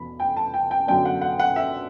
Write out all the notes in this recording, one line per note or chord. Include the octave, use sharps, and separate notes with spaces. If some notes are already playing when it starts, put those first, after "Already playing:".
Already playing: E2 B2 B5
G5
A5
G5
G5
F#2 D3 F#3 B3 D4 G5
F#5
F#5
F#5
E5